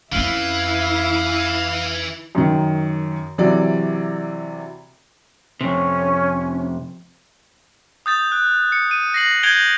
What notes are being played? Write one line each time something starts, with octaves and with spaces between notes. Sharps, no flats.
F2 E3 C#4 E4 F5
F#2 D#3
C3 E3 F#3 D5
F2 C3 C#4
D#6 G6 A6
F#6
C#7
D#7
A#6 C7 F#7
G6 G#6 D7 F7 G7